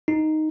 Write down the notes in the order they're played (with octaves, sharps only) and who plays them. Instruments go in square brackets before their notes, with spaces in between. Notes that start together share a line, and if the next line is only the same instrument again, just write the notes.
[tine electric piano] D#4